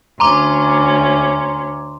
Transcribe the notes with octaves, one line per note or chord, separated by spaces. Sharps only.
D2 C#4 A#5 C6 D6